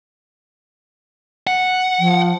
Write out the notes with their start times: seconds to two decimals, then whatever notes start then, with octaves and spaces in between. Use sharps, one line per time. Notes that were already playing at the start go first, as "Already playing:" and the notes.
1.47 F#5
1.99 F3